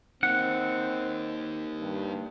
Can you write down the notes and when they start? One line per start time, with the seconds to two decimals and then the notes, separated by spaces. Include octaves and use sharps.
0.23 A#3 C4 D#4 F#5
1.80 G2